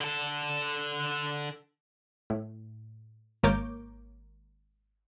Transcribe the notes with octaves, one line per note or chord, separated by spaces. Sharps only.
D3 A4
A2
G#1 A#3 A#4 C#5 D6 G6